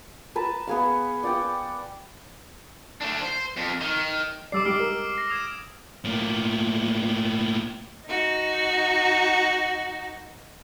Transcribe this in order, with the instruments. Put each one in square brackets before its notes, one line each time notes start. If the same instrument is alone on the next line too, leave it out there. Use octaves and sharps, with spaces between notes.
[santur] B4 A5 A#5
B3 G#4 F5
D5 F#5 G5
[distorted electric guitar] A3 D4
C5
F2
D#3
[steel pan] G3 D5 [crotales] D6 E6 C7
[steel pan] G#3 G4 [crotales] F6 C7 D7
[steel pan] A#4
[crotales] A#6 C7
D#6 G#6 E7
[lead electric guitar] A2 A#3
[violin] D#4 F#4